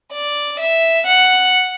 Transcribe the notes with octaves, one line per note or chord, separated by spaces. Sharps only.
D5
E5
F#5